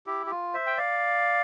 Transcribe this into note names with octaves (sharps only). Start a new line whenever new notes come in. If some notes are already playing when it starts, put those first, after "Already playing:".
E4 G4
G4
F4
C5 E5
G5
D5 F5